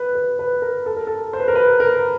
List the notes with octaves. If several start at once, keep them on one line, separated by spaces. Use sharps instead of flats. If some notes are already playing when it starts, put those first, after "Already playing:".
Already playing: B4
B4
B4
A#4
A4
A#4
A4
C5
B4
A#4
B4
A#4